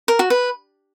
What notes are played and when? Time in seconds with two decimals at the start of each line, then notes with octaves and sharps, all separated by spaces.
0.08 A#4
0.19 F#4
0.30 B4